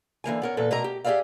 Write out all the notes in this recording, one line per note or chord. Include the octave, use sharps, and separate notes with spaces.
D3 E3 A#3 G#5
B3 A#4 C#5
E2 A#2 A4 B4
B2 A3 A#4 D#5 A#5
G4
G4 G#4 B4 D5 E5 F5